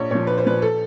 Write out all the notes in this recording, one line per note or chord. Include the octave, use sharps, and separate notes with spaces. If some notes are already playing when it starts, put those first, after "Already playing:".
Already playing: A#1 C#5
A#2 F3 C#5
A#1 B4
C5
A#2 F3 B4
A4